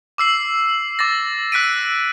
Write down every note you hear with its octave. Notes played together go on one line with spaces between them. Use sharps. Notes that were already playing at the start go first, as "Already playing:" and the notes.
D6 E6 C7 F#7
D6 A6 A#6
E6 F#6 B6 D7 D#7